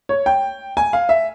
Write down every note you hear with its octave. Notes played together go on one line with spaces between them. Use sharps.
C#5
G5
G#5
F5
E5